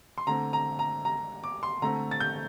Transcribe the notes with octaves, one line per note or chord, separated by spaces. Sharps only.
C6
D3 A3 C4 A#5
A#5
A#5
A#5
D6
C6
D3 A3 C4 A#5
A6
G6